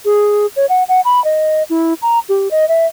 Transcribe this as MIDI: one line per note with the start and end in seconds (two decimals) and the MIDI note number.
0.05 0.46 68
0.56 0.66 73
0.69 0.83 78
0.88 1.01 78
1.05 1.22 83
1.24 1.63 75
1.70 1.94 64
2.02 2.19 82
2.29 2.51 67
2.51 2.68 75
2.68 2.86 76